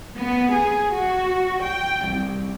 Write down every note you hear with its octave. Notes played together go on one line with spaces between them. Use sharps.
B3
G#4
F#4
G5
C2